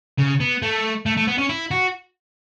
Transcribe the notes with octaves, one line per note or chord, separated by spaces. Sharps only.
C#3
B3
A3
A3
A3
B3
C#4
E4
F#4